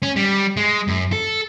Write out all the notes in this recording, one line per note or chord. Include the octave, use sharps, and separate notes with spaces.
C#4
G3
G#3
F#2
A4